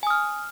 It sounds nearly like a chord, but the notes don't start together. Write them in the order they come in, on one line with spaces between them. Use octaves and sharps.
G#5 D#6 F6